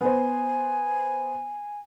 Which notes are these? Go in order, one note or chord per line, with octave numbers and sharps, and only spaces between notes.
B3 C5 G#5